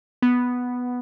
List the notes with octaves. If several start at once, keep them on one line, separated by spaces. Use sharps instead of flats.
B3